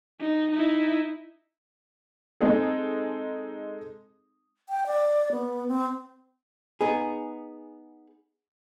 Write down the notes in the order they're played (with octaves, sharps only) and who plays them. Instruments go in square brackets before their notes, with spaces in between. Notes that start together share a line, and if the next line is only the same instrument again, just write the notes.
[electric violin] D#4
D#4 E4
[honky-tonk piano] G#3 C4 D#4 G#4 A4
[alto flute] G5
D5
B3
C4
[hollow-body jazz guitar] B3 D#4 G#4